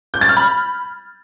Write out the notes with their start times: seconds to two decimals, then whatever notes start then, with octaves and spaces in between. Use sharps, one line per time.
0.14 G6
0.21 A6
0.29 F6
0.37 B5